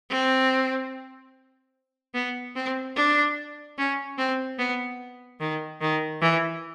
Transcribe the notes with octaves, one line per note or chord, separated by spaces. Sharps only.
C4
B3
C4
D4
C#4
C4
B3
D#3
D#3
E3